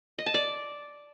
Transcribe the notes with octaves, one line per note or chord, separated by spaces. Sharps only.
D#5
A5
D5